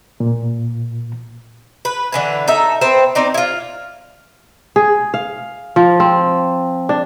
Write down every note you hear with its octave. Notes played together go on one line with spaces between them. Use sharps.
A#2
B4
D3 E3 B4
D#4 A4 E5
B3 C4 C5
C4 D#4 D5
E4 F4
G#4
F5
F3
C4
D4